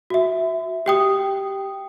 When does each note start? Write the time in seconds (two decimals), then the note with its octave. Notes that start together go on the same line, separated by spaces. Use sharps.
0.10 F#4 E5
0.86 G4 G5 D#6